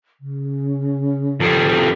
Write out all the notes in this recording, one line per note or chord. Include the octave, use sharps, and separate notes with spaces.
C#3
F2 G3